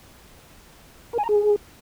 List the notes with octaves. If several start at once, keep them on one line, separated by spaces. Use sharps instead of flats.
A#4
G#5
A#5
G#4